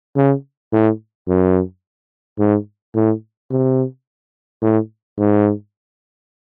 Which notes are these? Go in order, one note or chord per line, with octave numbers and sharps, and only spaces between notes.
C#3
A2
F#2
G#2
A2
C3
A2
G#2